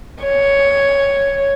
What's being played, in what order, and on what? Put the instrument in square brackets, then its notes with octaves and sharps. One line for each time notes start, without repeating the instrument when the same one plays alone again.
[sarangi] C#5